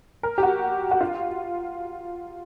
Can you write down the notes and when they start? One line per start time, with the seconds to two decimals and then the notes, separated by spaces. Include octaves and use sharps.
0.23 A#4
0.38 G4
0.43 F#4
0.91 F#4
1.01 F4